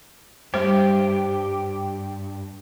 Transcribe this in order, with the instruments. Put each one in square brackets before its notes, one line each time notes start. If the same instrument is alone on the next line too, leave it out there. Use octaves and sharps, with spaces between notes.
[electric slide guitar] G2 [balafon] G3 C5 [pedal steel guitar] G4